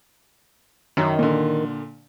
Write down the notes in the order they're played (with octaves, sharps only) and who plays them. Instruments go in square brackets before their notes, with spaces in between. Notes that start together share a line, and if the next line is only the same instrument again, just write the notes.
[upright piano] F#2 [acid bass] D#3
[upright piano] A#2 D3